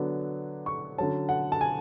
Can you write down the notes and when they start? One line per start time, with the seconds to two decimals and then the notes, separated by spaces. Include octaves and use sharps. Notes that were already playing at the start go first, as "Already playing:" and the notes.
Already playing: D3 F#3 B3 D4
0.66 C#6
0.98 D3 F#3 C#4 A5
1.29 F#5
1.52 A5
1.61 G#5